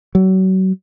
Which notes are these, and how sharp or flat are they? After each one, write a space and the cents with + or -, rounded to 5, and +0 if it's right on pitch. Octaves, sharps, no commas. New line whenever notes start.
F#3 +30